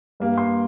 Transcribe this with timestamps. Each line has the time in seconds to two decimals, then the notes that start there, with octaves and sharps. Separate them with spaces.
0.20 G2 G3 A#3
0.38 C6